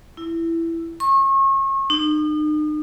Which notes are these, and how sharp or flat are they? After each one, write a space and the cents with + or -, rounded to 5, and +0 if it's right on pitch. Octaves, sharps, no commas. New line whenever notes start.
E4 +10
C#6 -35
D#4 -40